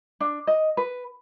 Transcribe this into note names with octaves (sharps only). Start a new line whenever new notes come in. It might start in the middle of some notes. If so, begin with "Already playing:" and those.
D4
D#5
B4